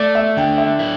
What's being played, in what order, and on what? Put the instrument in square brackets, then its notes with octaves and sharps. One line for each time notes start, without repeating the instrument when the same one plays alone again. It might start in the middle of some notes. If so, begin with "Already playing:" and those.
Already playing: [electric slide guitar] A3 [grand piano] D5
[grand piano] E5
[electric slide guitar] D3 [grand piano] G5
[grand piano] E5
[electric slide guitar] E4